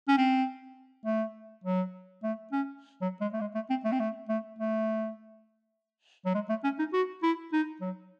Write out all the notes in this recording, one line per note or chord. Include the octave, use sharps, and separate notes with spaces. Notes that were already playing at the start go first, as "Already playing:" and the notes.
C#4
C4
A3
F#3
A3
C#4
F#3
G#3
A3
G#3
A3
C4
A3
C4
A3
A3
A3
F#3
G#3
A3
C#4
D#4
F#4
E4
D#4
F#3